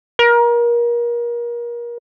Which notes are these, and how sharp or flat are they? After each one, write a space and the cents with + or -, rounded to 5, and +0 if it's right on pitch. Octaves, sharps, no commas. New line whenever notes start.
A#4 +30